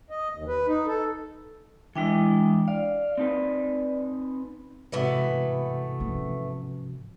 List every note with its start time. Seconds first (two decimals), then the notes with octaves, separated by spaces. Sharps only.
0.10 D#5
0.35 D#2
0.48 B4
0.67 D#4
0.87 A4
1.96 E3 G#3 D4 E4 D#5 G5
2.68 D5 F5
3.18 C4 D#4 B4
4.92 G#2 C3 E3 A3 B3 F#4
6.00 F3 C#4